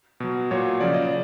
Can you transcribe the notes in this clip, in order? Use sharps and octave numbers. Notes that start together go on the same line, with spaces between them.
B2 F#3
A#2 F#3 C#5
C#3 F3 D5
D#5
D5